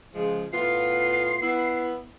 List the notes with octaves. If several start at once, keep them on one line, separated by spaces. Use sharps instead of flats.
C#3 F3 G#3
A2 B3 F4 C7
B3 E4